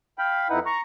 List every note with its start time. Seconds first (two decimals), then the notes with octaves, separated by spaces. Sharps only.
0.18 F5 G5 B5
0.50 F2 D#4 E4 B4 F#5
0.66 A#5 C#6